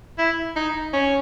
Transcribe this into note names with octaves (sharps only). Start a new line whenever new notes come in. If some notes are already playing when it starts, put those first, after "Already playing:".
E4
D#4
C#4